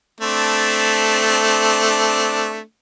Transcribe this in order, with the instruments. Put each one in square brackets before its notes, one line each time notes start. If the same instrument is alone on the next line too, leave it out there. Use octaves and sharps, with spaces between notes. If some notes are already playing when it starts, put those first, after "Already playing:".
[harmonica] A3 C4 D4